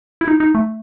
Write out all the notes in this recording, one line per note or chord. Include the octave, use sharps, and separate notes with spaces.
E4
D#4
D#4
A3